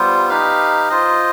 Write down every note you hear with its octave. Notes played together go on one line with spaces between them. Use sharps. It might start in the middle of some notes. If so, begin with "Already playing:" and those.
Already playing: G3 B3 F4 C5
D#4 G4 B4 F5
F4 C5 D#5